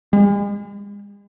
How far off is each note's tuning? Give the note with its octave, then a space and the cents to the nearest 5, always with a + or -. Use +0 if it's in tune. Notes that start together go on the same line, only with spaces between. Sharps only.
G#3 -40